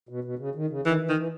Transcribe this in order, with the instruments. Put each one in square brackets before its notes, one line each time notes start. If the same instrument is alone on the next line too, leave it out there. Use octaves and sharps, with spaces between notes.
[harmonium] B2
B2
C#3
D#3
C#3
[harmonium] D#3 [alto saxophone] E3
[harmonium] E3
[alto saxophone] D#3
[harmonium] E3